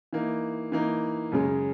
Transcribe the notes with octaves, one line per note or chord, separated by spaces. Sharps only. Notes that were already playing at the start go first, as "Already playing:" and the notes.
E3 A#3 D#4
E3 A#3 D#4
F#2 C#3 G#3